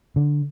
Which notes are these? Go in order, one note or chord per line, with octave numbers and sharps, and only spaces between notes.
D3